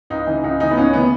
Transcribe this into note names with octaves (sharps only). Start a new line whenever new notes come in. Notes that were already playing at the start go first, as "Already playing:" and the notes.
C#2 D#4
C#3 E3
C#2 D#4
C#3 E3 D#4
B3
C#2 C#4
C#3 E3 B3